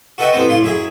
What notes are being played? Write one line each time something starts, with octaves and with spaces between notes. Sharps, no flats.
F#4 A4 B4 D#5 E5 G5
A1 B3 C4 C5
A2 F4 C6
F#2 E4 G#4